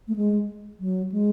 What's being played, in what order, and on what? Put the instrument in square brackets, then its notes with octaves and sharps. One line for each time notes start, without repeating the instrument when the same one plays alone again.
[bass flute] A3
G#3
F#3
G#3